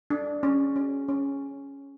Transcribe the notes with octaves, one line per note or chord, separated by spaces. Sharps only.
D4
C#4
C#4
C#4